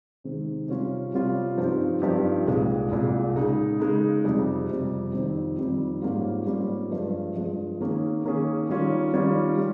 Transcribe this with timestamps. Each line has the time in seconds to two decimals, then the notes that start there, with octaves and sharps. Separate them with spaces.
0.24 C3 D#3 G#3 C4
0.68 C3 G3 C#4 F4
1.13 C3 G3 C#4 F4
1.57 G2 F3 C4 D#4 G4
2.02 G2 F3 C4 D#4 G4
2.46 C2 A#2 G#3
2.91 C2 A#2 G#3
3.36 C#3 G#3 D#4
3.80 C#3 G#3 D#4
4.24 F2 C3 G3
4.69 F2 C3 G3
5.13 F2 D#3 G3 C4
5.58 F2 D#3 G3 C4
6.02 G#2 G3 A#3 C#4 F4
6.47 G#2 G3 A#3 C#4 F4
6.91 G2 F3 G#3
7.36 G2 F3 G#3
7.80 D#3 A#3 C#4 G#4
8.25 D#3 A#3 C#4 G#4
8.69 D#3 G3 C#4 F4
9.14 D#3 G3 C#4 F4
9.58 G3